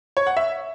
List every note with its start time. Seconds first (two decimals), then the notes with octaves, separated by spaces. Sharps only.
0.17 C#5
0.27 F#5
0.37 E5